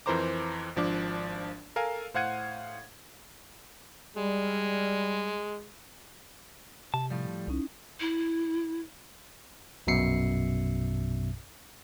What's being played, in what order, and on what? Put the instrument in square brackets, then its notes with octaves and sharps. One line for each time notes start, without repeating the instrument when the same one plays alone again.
[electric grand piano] F2 E3 A#4 C5 A#5 D6
G#1 F3 D4 D6
A4 A#4 F5 G#5
A2 C5 F5 F#5 G#6 D#7
[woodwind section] G3 [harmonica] G#3
[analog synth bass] C3 [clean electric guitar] A5
[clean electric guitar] A2 F3 G3
[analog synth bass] C2 [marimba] C#4 D#4 E4
[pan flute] E4
[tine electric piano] A#1 F#2 B2 E5 C7 C#7